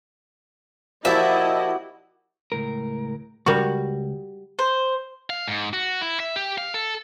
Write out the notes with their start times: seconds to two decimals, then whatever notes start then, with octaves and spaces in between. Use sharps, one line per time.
1.05 A#2 F3 E4 F#4 G4 D#5 E5 A5
2.52 C#2 A2 A#4
3.46 C#2 G3 F#4 A#4 C#6
4.59 C5
5.30 F5
5.48 G#2
5.73 F#4
6.01 E4
6.20 E5
6.36 G4
6.58 F5
6.74 A4